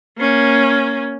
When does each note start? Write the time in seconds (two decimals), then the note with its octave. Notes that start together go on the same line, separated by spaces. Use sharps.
0.18 A#3 C#4